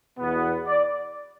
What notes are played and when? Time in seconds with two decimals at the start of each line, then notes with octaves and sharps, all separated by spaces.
0.19 E2 B2 B3
0.66 D5